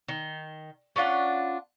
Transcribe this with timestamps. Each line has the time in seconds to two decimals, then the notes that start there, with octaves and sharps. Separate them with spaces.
0.08 D#3
0.96 C#4 D4 F4 F#5